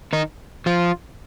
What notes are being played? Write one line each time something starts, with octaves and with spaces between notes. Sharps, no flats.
D#3 D#4
F3 F4